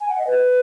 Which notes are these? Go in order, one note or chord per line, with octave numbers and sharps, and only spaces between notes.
G#5
F#5
D#5
B4